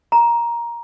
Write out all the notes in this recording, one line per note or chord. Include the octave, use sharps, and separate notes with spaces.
A#5